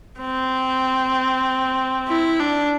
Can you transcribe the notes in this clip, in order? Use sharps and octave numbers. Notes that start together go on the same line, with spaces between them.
C4
E4
D4